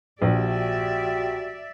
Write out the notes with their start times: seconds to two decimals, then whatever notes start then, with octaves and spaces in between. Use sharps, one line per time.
0.22 A#1 F#4 G4 D5 E5